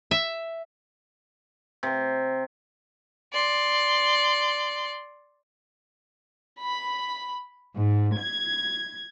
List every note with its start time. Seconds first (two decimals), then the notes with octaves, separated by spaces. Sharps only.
0.11 E5
1.83 C3
3.34 D5 C6
6.61 B5
7.75 G#2
8.18 G#6